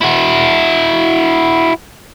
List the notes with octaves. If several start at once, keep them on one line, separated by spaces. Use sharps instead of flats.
E4 F#4